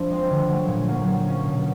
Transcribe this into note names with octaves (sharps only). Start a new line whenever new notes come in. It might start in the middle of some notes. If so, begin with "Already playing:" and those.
Already playing: F3 D4
G#3 C4
D3
F#3 A3
A#2
F#3 A#3
F#3
A#3 C#4
B2